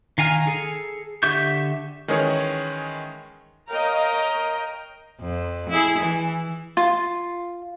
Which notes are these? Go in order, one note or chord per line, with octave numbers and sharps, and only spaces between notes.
D#3 F5 G#5 A#5 F6
G#4 A4
D3 G4 E5 C#6 G6
D#3 E3 G#3 C#4 G#4 C#5
A#4 C#5 D#5 F5 G5 A#5
F2
E4 G#4
E3
F4